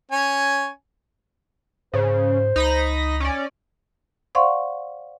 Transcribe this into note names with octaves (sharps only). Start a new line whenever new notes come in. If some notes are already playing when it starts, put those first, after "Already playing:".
C#4 C#5 G#5
G#2 C#3 C5
C#2 D#4 B5 A#6
C#4 D5
C5 D5 F5 F#5 C6 C#6